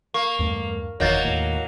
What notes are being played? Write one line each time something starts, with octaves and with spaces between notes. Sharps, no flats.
A#3 C#6
E2 G2 A3
F1 E2 D#3 F#3 A#3 D#5 G6 A6
D#2 A2